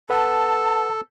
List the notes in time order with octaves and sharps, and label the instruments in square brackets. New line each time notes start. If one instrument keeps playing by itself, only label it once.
[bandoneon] A4 [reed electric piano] B4 F#5 [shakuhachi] A5